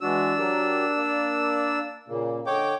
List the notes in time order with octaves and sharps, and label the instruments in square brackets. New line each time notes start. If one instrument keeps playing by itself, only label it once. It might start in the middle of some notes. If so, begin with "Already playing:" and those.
[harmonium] E3 G#3 F#4 [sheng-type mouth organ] D4 E6
[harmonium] F#3 G4 A#4
A#3 D5
A#2 C#3 A#3
[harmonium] D3 D#5 [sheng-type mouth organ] C#5 G5 D6